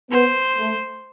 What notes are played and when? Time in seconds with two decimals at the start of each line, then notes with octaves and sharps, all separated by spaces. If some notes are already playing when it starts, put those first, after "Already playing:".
0.11 B3 C5
0.58 A3